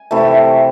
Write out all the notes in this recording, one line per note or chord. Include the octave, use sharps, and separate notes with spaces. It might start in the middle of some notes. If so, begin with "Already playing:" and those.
Already playing: G#5
C3 E3 A3